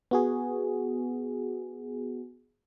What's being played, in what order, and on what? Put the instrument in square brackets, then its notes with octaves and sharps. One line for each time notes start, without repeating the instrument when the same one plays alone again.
[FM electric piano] B3 F#4 G#4